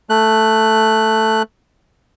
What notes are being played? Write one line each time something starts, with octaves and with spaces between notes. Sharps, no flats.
A3 F#6